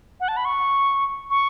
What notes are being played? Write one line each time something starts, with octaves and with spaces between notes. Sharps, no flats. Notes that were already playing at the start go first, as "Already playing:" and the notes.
F#5
A5
B5
C#6
C#6